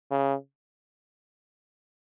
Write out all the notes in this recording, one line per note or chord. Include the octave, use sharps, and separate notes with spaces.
C#3